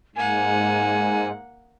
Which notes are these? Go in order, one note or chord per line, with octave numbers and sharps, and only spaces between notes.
G#2 A#3 F#5 G#5